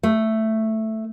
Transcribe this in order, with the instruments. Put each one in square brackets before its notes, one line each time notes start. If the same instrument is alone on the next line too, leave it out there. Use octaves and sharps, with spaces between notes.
[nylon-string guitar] A3